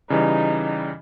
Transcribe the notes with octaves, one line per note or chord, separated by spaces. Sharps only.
C#3 E3 G3 D#4